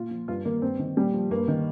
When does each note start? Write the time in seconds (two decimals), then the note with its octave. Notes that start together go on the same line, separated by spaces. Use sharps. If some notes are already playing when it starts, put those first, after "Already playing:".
Already playing: A#2 F4
0.11 F3
0.28 G2 F4
0.45 D#3 A#3
0.62 G2 C4
0.79 D#3
0.97 A#2 G3
1.14 F3
1.31 G2 A#3
1.48 D#3